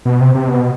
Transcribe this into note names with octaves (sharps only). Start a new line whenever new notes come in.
B2
C3
C3
B2